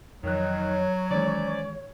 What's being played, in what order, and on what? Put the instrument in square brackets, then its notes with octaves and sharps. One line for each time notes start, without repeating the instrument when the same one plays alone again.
[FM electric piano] F2 F3 F#6 [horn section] D#3 [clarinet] F#3 [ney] C#5
[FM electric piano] D#3 E3 G#3 [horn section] C#4 C5 D5